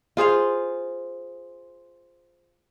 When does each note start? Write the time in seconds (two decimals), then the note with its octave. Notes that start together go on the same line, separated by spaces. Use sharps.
0.17 F4 G#4 C5 F5